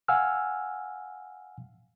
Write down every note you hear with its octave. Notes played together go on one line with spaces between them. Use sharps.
F5 F#5 G#5 E6 F6